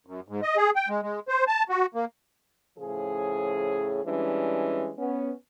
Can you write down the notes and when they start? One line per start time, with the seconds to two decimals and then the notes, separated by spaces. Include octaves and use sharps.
0.07 F#2
0.28 G#2
0.42 D#5
0.57 G#4
0.76 G5
0.89 G#3
1.02 G#3
1.28 C5
1.48 A5
1.69 F#4
1.95 A#3
2.79 A2 C#3 F3 G#4
4.04 E3 G3 G#3 C#4 D4
4.98 B3 C#4